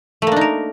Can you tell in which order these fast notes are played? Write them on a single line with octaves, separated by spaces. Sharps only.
A3 A#3 D4 D#4 A#4